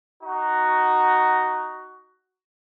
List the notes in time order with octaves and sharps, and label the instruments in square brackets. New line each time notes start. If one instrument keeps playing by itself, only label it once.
[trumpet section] D#4 F#4